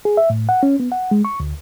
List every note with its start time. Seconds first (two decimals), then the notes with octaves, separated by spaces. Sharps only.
0.05 G#4
0.17 E5
0.30 A2
0.49 F#5
0.63 C#4
0.80 B3
0.92 F#5
1.11 G#3
1.25 C#6
1.40 D2